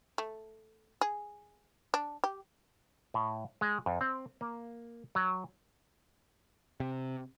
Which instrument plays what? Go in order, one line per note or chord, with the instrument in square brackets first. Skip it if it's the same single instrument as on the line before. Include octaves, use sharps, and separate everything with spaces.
[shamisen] A3
G#4
D4
G4
[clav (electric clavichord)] A2
G#3
F2
C4
A#3
F#3
[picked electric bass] C3